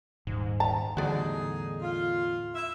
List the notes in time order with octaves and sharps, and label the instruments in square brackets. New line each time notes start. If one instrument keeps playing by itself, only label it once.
[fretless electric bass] D#1 [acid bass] G#2
[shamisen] A5 A#5
[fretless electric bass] E2 A2 G3 [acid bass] D3 [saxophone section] D#4 G#4 [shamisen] F#4 D5
[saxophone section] F4
E5